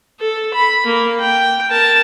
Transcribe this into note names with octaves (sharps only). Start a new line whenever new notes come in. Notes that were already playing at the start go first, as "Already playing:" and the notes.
A4
B5
A#3
G5
A#4 A5